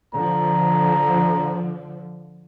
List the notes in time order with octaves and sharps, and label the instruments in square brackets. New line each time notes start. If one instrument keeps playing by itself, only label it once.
[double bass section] D3 F3 [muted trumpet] A#5